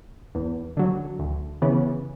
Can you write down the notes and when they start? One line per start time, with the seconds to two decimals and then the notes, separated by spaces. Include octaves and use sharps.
0.35 E2
0.77 D3 F#3
1.19 D2
1.62 C#3 E3 B3